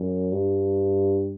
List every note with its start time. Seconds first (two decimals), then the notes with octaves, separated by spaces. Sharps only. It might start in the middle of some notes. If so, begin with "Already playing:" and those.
Already playing: F#2
0.32 G2